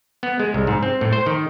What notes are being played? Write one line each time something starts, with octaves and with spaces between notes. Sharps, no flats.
B3
G#3
C2
G#2
C4
A2
C5
D#3